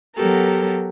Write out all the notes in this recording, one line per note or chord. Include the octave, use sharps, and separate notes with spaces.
F#3 B3 G4 A4 A#4